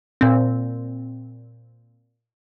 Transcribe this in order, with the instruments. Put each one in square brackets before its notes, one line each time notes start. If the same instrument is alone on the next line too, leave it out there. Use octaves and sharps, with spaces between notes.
[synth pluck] A#2 C4